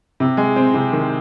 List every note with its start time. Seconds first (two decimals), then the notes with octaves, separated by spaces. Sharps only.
0.20 C3
0.37 G#3
0.56 C4
0.74 C3
0.93 D#3